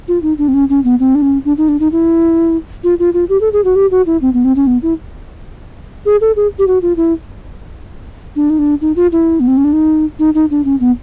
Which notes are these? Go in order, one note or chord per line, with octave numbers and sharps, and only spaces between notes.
F4
D#4
D4
C4
C#4
C#4
B3
C4
D4
C#4
D4
D#4
D4
D#4
E4
F4
F4
F4
G4
A4
G#4
F#4
G4
F#4
E4
C4
B3
C4
C#4
B3
E4
G#4
A4
G#4
G4
F#4
F4
E4
D4
D#4
D4
D#4
F4
E4
B3
C4
C#4
D4
D#4
D#4
D#4
D4
C#4
B3